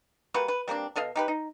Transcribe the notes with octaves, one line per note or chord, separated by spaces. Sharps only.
G3 A#3 F#4 B4
B4
G3 A#3 C4 D4
B2 A4 D#5 F5
D#4 G4 B4
D#4